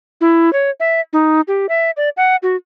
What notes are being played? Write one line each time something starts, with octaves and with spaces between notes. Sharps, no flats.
E4
C#5
E5
D#4
G4
E5
D5
F#5
F#4